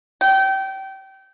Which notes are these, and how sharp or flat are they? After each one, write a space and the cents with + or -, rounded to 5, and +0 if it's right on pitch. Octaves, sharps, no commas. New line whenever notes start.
G5 -25